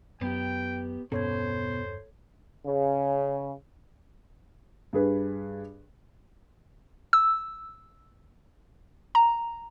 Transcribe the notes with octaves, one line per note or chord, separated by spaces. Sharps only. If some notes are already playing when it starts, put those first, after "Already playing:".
F#2 B3 G4 G5
E1 G2 B2 C#4 A4 C5 C#5 G#6
C#3
G2 G#4 B4
E6
A#5